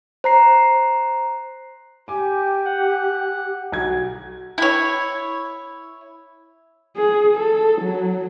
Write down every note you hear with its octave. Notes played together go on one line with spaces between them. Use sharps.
C5 A#5 C7
G4 G#5 D6
F#5
B1 F#4 G#6
E4 C#5
G#4
A4
F#3